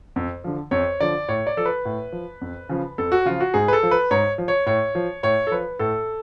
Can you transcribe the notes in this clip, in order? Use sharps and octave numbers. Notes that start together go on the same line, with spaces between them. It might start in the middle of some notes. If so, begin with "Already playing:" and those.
F2
D3 F3
F2 C#5
D3 F3 D5
A2 C#5
D5
F3 A4
B4
A2
F3
F2
C#3 F3
F2 A4
F#4
C#3 F3 F4
F#4
G#2 G#4
B4
A4
F3
B4
G#2 C#5
F3
C#5
A2 C#5
F3
A2 C#5
A4
F3 B4
A2 A4